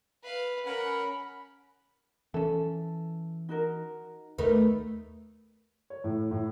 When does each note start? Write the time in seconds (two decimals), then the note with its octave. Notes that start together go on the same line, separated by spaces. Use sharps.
0.23 B4 F5
0.66 C#4 A#4 F#5 B5
2.34 E3 C#4 A4
3.49 D#4 F#4 A#4
4.38 D#2 A3 B3 D#4 A#4 B4
5.90 C#5
6.04 A2
6.31 A2